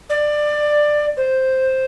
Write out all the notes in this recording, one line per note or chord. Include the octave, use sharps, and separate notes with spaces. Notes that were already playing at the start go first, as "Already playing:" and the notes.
D5
C5